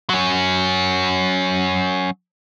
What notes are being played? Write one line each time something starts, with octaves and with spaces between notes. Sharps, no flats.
F#3 C#4